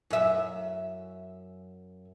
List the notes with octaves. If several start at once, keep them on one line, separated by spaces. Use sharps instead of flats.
F#2 E5